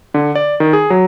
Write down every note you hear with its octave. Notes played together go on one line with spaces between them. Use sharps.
D3
D5
D#3
G#4
F#3